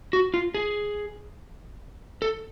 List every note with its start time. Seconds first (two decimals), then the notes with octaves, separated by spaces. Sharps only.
0.13 F#4
0.34 F4
0.55 G#4
2.22 A4